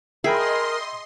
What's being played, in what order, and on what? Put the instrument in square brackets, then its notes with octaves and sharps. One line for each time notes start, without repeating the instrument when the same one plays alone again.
[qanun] G#4 [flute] A#4 [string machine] D#5 C6 [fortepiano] E5 G5 B5